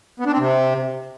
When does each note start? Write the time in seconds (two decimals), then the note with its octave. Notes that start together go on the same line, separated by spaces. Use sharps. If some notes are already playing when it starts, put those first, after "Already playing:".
0.20 B3
0.26 D4
0.32 C4
0.39 C3